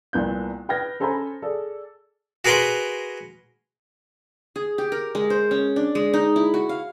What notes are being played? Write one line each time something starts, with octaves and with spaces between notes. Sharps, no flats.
C2 A#2 B3 F#6 G6
B4 G5 F6 G#6 A#6
C#4 A4 C5 G#5 A#5 B5
G#4 A4 D5
F#4 G#4 A#4 B4 A#5 C6
G#4
G4
A#4
G#3
C5
C#4
D4
G#3
D#4
E4
F#4
F5